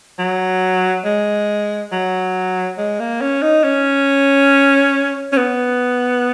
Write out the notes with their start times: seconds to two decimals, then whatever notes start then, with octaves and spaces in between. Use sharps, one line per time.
0.19 F#3
1.05 G#3
1.92 F#3
2.78 G#3
3.00 A#3
3.22 C#4
3.42 D#4
3.64 C#4
5.33 C#4
5.38 B3